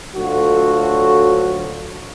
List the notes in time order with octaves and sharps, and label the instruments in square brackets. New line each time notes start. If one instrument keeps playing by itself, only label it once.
[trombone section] D2 F#3 F4 F#4 A4